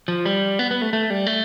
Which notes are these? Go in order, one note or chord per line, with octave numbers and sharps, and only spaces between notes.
F3
G3
B3
B3
A3
A3
G3
A3